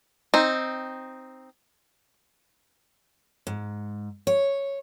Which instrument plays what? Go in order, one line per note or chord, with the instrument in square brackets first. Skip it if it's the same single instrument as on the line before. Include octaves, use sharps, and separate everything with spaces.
[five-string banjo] C4 D#4
[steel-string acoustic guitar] G#2
C#5